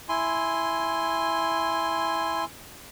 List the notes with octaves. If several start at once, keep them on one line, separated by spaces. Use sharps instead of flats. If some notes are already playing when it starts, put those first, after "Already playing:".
E4 G#5 C6